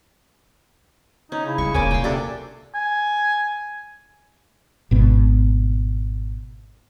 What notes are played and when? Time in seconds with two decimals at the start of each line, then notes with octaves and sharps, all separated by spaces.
1.32 C#4 D#4
1.46 C#3 E4
1.58 G3 C#6
1.74 E1 G3 A#3 C#4 D5 G#5
1.91 B2 G5 C6
2.04 C3 D4 G4 A4 D5
2.75 G#5
4.91 G#1 B2